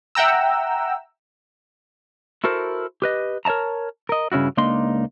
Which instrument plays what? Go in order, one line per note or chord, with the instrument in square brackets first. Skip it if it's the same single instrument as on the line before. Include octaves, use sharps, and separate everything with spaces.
[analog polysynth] E5 F#5 G5 A#5 E6
[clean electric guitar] E4 F#4 A4 A#4 C5
G4 B4 D#5
A#4 C#5 D#5 A5 A#5
A#4 D#5
G2 C#3 C#4 E4 F#4
C#2 A#3 D4 D#4 D#5 C6